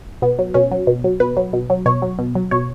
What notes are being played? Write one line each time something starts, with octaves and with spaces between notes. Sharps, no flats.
B2 B3
F#3
B2 C#4
F#3
B2
F#3
B2 B4
F#3
B2
F#3
B2 C#5
F#3
B2
F#3
B2 C#5